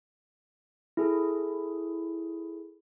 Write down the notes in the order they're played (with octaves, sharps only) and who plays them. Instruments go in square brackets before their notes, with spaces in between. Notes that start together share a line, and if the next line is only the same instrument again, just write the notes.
[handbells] E4 G#4 A4